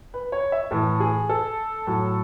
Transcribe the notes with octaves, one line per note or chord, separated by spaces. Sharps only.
B4
C#5
E5
A2 E3 A4
G#4
A4
A2 F#3